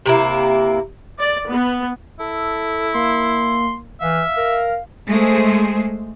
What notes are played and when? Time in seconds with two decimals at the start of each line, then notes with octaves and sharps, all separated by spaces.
0.06 C3 A#3 E4
1.20 D5
1.49 B3
2.20 E4 A4
2.95 A#3 C6
4.01 E3 E5 F5
4.37 A#4
5.08 G#3 A3 G#4 C5